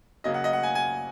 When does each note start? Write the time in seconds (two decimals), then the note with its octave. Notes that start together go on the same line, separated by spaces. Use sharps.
0.24 C#3 F#3 A#3 D#5
0.34 F#5
0.44 D#5
0.53 F#5
0.63 G#5
0.75 G#5